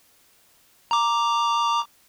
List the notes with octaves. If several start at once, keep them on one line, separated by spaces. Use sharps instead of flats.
A#5 D6